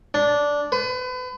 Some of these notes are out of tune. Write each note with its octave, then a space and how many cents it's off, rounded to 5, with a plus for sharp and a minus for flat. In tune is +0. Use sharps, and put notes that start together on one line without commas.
D4 -10
B4 +35